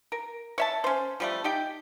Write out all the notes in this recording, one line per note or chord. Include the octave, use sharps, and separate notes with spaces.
A#4
C#5 E5 A5
C#4 C5
F3 G3 A3
D#4 G4 G5